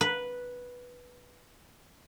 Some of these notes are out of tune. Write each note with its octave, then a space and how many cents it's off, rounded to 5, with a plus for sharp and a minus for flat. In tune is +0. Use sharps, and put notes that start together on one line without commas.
B4 -5